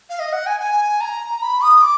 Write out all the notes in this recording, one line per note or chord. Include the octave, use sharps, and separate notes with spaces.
F5
D#5
F#5
G#5
G#5
A#5
B5
D#6
D6